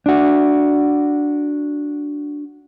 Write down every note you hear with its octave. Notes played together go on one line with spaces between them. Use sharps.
D4 F#4